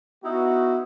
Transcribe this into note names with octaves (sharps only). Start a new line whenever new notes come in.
B3 D#4 E4 F#4